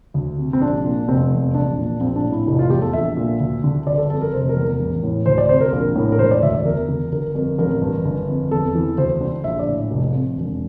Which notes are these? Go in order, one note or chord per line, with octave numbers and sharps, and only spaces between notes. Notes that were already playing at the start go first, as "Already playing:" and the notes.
D2
C3
C4
A#1 D4
A#2
F1 C4
E2
A#1 D4
A#2
A#1 C4
D4
A2
E4
F1 E4
F4
E2 G4
A4
A#1 E5
A#2
D2
D3
G1 D5
A4
F2 A4
A#4
F1 C5
A#4
E2
A#4
A1
A2
D2 C5
D5
C3 C5
A#4
A#1 A#4
A2
A#4
E1 C5
D5
D2 E5
D5
E2 A#4
D3
G1 A#4
F2 A#4
A1 A#4
G2
G1
F2
E2 A4
E3
D2 C5
D3
A#1 E5
D5
A2
F1
F2
E1